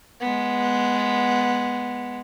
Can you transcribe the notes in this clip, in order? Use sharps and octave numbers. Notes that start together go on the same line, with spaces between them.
G#3 B3